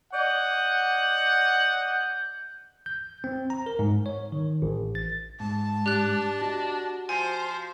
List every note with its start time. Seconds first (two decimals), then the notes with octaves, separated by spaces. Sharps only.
0.13 D5 D#5 F#5 G6
2.86 G6
3.24 C4
3.50 A#5
3.66 A#4
3.79 G#2
4.06 C#5
4.32 D#3
4.62 A1
4.95 A6
5.40 G#2 A5
5.86 D4 G4 F#6
6.42 F#4 D#5
7.09 F3 C5 G#5